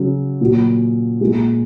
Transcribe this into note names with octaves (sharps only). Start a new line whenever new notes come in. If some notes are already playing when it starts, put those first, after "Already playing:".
Already playing: C#3 F#3
A#2 F#3
A#2 G#3